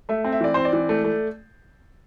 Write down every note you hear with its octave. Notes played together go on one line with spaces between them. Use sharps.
A3 E5
C4
E5
E3 D5
C4 C5
D5
E3
A3
A3